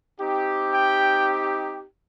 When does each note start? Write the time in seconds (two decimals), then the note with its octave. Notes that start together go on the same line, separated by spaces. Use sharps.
0.19 C4 D#4 G4
0.71 G5